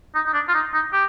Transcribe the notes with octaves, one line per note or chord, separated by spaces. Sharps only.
D#4
D#4
D4
F4
D#4
D#4
G4